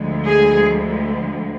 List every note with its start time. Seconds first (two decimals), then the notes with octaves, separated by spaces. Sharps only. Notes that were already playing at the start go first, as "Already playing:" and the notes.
Already playing: D2 D3 F3 G#3
0.25 G#4